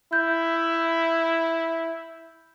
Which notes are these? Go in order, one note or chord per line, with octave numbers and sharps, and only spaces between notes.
E4 G6